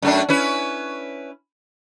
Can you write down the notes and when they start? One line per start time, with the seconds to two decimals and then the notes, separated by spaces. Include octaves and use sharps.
0.02 F#2 A3 D4
0.29 C#4 E4 B4